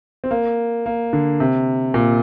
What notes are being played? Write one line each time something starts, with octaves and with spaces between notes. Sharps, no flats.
C4
A#3
A#3
D3
C3
A#2